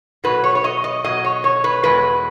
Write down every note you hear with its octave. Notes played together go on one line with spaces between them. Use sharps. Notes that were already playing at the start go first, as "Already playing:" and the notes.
B2 F#3 B4
C#5
C#5
D#5
D#5
B2 F#3 D#5
C#5
C#5
B4
E2 B2 G#3 B4